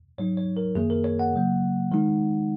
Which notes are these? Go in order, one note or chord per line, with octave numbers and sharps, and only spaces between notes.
G#2 F#3 D#4 C#5
C#5
A#4
F#2 D#3 A#3 G#4
A#4
C#5
F#5
C#3 F#3 A#3
D#3 G#3 D#4